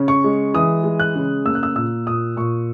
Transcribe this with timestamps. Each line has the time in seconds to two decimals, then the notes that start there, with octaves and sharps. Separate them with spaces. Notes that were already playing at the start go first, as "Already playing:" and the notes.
Already playing: C#3 C#4
0.08 C#6
0.24 G#3
0.54 E3 D#6
0.84 G#3
1.00 F#6
1.16 C#3
1.45 A#3 E6
1.55 F#6
1.63 E6
1.75 A#2 E6
2.06 A#2 D#6
2.36 A#2 C#6